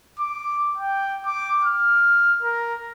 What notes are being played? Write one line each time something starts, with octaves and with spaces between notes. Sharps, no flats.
D6
G5
D6
F6
A#4